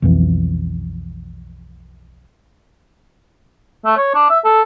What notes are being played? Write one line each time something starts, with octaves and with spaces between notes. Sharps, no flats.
B1 F2 E3
A3
C#5
D4
E5
A4